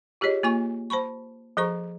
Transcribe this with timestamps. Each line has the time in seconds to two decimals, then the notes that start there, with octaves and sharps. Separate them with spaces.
0.21 F4 G4 G#4 C#5 D#5
0.43 A#3 F4 G#5 C#6
0.90 C5 A5 B5 C#6
1.57 F3 G#4 A4 C5 A#5 C#6